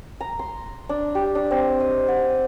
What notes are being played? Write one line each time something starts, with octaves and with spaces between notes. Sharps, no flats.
A#5
C6
D4
G4
D4
C4
D#5
F#5